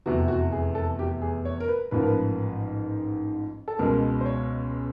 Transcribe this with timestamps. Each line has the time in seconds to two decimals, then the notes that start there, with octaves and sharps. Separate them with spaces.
0.06 F1 E2 C3 E3 F#4
0.28 F#4
0.52 G#4
0.75 A4
0.99 G4
1.22 G#4
1.45 C#5
1.60 A#4
1.68 B4
1.91 A1 G#2 F3 A#3 B4
2.00 A#4
2.07 B4
3.68 A4
3.79 C#2 B2 G#3 A#4
4.21 C5
4.26 C#5